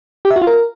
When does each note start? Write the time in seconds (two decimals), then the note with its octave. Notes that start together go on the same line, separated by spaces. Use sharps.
0.25 G4
0.30 E5
0.36 F#4
0.42 F4
0.47 A#4